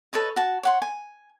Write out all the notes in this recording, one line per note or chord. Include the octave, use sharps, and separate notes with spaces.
A4 B4 C#5 D#5
F#4 A5
C#5 F#5 C6
G#5